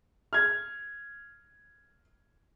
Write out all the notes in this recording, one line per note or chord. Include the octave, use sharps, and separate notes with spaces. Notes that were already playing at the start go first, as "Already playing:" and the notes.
F6 G#6